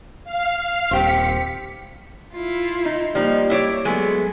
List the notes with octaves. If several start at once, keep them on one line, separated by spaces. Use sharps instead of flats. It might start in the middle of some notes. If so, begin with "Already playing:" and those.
F5
D#1 C4 G4 C5 B6 C#7
E4 F4
D#4
F3 G3 A#3 D#4
E4 C#5 D5
F#3 G#3 A3 B3 G#4